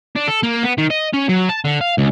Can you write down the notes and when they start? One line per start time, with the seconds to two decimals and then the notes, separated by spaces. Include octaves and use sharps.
0.16 D4
0.27 A4
0.43 A#3
0.63 B3
0.78 D#3
0.91 D#5
1.14 C#4
1.29 F#3
1.49 A5
1.65 D3
1.81 F5
1.98 C#2